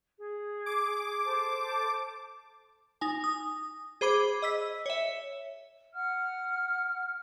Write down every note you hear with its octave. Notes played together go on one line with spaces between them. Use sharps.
G#4
D6
A4 C5 A5
D#4 G#5
D#6
G#4 C5 B5 D6 G#6
D#5 E6 B6
C#5 E5
F#5 F6